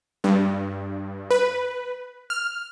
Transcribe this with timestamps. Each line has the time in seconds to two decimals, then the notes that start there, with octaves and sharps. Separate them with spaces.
0.24 G2
1.31 B4
2.30 F6